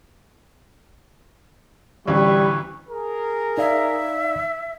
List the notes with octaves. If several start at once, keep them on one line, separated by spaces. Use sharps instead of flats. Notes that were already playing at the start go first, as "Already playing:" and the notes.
A1 D2 G3 E4 B4 C#6
G#4 A#4
D#4 D5 E5 F5